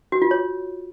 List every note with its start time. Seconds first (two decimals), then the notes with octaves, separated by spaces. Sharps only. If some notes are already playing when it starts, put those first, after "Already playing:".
0.12 F#4
0.22 F4
0.31 C#5